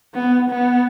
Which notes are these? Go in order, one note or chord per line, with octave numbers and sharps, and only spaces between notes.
B3
B3